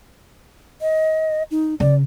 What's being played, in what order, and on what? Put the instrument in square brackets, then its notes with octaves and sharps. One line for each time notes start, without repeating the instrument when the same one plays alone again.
[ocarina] D#5
D#4
[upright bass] C#3 [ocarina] D5